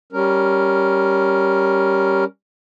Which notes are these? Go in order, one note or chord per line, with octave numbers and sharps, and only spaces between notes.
G3 C#4 A#4